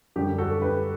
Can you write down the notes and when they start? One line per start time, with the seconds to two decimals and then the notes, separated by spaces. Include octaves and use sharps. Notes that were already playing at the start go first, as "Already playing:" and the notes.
0.16 F#2 D3 G3 G4
0.38 F#4 A4
0.62 G4 B4